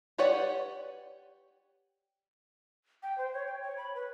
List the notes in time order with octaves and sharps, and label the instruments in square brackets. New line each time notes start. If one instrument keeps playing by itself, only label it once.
[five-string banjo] G4 B4 C#5 D5 F#5
[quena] G5
C5
C#5
G5
C#5
B5
B4